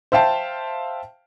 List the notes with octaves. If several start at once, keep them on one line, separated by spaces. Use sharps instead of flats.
C5 E5 F5 G5 A5